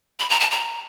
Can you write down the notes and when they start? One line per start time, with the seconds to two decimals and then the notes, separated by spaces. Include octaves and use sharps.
0.20 B5
0.30 A#5
0.40 A5
0.51 A#5